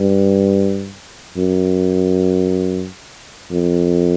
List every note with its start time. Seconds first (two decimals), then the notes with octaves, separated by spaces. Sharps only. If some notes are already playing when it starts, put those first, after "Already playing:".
Already playing: G2
1.37 F#2
3.51 F2